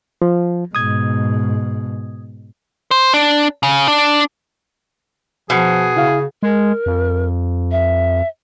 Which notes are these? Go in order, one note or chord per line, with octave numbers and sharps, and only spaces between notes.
F3
G#2 B2 D#6 G#6
C5
D4
C#3
D4
B2 F3 G#4
C#3 E4 F5
G#3 A#4
F2
E5